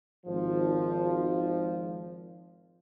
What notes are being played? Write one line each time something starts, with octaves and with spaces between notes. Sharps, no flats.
G#1 F3